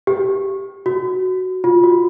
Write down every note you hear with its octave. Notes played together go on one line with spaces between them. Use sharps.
G4
F#4
F4
F#4